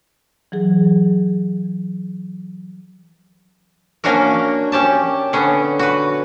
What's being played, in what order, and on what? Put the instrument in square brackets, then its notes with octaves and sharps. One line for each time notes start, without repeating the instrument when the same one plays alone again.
[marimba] E3 F#3 G#4
[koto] A#3 C#4 D4 F#4 A#4
C#4 G4 A5
D3 B3 C#4
F#4 B4